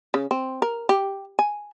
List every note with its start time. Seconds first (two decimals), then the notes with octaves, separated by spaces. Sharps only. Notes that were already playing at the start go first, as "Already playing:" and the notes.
0.14 C#3
0.31 C4
0.62 A#4
0.89 G4
1.39 G#5